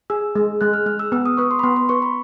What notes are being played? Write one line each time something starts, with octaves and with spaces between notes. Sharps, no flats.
G#4 E6
G#3
G#3 F#6
F6
G#3 F6
E6
B3 E6
D#6
B4 C#6
C6
B5
B3 C6
C6
B4 C#6
B5